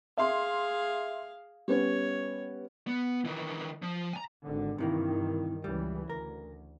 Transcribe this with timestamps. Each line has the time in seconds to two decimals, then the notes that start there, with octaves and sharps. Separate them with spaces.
0.17 G#4 E5 F5 C6
1.68 G3 B3 C#4 C#5
2.87 B3
3.25 D#3 E3
3.82 F3
4.13 G#5 A#5
4.44 G#1 D3
4.78 G2 C3 D#3 E3 A#3
5.64 C#2 C#3 E3 G3
6.10 D2 A#4